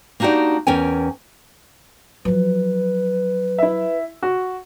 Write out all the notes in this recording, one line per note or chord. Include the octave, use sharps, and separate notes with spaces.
A#3 D4 D#4 F#4 G4 D5
E2 C#4 A#4 G5 G#5
F3 F#3 B4
E4 E5
F#4